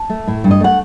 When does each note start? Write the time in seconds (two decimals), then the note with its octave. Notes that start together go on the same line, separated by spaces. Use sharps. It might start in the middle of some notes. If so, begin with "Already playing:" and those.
Already playing: A5
0.10 A3
0.27 A2
0.44 G2
0.51 D#5
0.60 A3 F#5